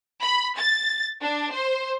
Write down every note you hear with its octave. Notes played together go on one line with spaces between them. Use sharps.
B5
A6
D4
C5